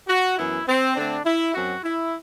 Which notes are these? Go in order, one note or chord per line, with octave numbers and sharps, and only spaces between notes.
F#4
F#2 E3 B3 E4
C4
D3 A3 C4 D4
E4
F#2 F#3 C4 F#4
E4